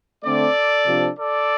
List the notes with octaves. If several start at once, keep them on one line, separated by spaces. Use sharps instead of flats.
D3 A3 C4 A4 D5
C3 F3 D4
A4 D5